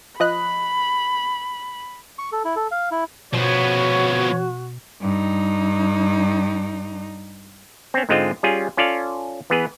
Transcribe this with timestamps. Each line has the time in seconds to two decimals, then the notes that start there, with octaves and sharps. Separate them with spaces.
0.20 F3 D#5 B5 F#6
2.19 C#6
2.32 A4
2.45 E4
2.56 A4
2.71 F5
2.91 E4
3.33 B2 F3 B3 F#4 C#5
5.02 G2 D#4
7.94 C4 C#4
8.09 G#2 D3 G#3 C4 F4 D#5
8.43 G3 C#4 F4 G#4
8.77 C#4 F4 A4 D5 F5
9.50 E3 B3 G#4 B4